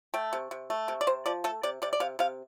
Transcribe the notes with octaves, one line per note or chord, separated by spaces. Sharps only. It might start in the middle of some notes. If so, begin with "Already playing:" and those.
A3 G5
C3
C3
A3
C3
D5
C3 C5
F3 D5
A3 A4
C3 D5
C3 D5
D5
C3 F5
C3 F5